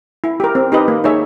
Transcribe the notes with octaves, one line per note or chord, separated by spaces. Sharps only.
E4
G4 A#4
C4
D#4 G4 B4 D#5
A#3
D#4 G#4 C#5 E5